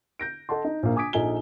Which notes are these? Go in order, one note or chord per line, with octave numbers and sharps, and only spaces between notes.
G6 A#6 D7
A4 D#5 F#5 A5 C6
D#4
A#1 A#3
G#5 D6 D#6 G#6 B6 D7
A#1 D#4 A4 G#5 G7